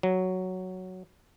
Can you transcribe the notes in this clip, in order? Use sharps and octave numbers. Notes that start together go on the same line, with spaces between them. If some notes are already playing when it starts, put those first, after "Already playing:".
F#3